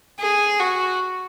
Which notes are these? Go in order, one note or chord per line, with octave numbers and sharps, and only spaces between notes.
G#4
F#4